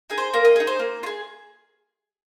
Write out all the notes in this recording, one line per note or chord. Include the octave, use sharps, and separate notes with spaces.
D#4 G#4
C5
A#3 A#4
D#5
D#4 G#4
C5
A#3
F4
G#4